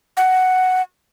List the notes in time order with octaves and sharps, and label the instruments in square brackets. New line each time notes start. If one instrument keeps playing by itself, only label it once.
[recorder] F#5